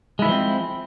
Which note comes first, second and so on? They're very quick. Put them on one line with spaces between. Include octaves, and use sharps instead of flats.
G#3 E4 E3 F3 C4